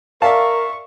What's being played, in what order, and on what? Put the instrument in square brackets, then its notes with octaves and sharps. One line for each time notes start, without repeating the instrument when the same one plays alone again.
[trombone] A#4 [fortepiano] D5 E5 A5 [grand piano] F5 [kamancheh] C#6